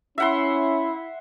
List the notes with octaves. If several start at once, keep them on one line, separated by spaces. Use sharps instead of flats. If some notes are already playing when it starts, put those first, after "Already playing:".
C#4 E4 E5 F#5 C6